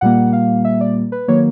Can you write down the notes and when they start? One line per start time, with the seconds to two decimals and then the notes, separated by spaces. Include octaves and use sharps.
0.01 A#2 G3 A#3 F#5
0.33 F5
0.65 E5
0.81 D5
1.12 B4
1.28 D#3 F#3 A#3 C#5